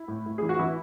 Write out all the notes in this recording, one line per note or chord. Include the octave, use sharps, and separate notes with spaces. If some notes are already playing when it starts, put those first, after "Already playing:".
Already playing: E4
A2
A2
E3 G#4
F#4
E3 E4